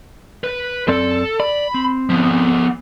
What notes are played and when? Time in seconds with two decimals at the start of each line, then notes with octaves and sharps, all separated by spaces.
0.44 B4
0.88 F#2 C4 A4 D5
1.40 D5 B5
1.74 C4
2.10 F3 B3